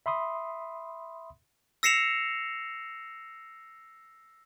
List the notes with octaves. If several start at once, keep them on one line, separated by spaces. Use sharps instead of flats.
E5 B5 C6 D#6
E6 A#6 C7 C#7 E7 F7